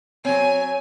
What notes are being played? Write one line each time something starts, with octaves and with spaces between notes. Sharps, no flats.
F#3 C4 C#5 G#5